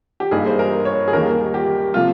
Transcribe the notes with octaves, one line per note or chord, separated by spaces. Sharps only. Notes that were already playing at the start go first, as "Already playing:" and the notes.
G4
G2 G3 A#3 D#4 G#4
C5
A#4
C#5
G#4
D#2 D#3 G3 A#3 A#4
G4
C3 F3 A#3 F4